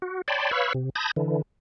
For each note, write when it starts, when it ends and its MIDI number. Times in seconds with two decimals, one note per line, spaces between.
0.02 0.22 66
0.28 0.51 73
0.28 0.51 74
0.28 0.51 79
0.28 0.51 81
0.28 0.51 83
0.28 0.51 84
0.51 0.73 71
0.51 0.73 73
0.51 0.73 77
0.51 0.73 83
0.51 0.73 85
0.51 0.73 88
0.74 0.90 48
0.95 1.11 81
0.95 1.11 83
0.95 1.11 87
0.95 1.11 91
0.95 1.11 92
0.95 1.11 94
1.16 1.42 50
1.16 1.42 52